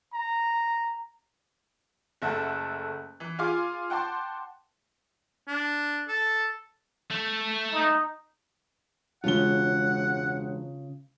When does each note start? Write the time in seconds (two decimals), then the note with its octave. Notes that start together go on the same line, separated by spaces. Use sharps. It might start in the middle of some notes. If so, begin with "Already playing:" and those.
0.13 A#5
2.22 F#1 A3 E5 F#5 A5
3.20 E3
3.39 F4 G#4 F5 G#5 C6 D6
3.90 F#5 G5 A5 C6 D6
5.47 D4
6.08 A4
7.11 A3
7.73 D#4
9.24 E1 C#3 G#3 F4 F#5 G7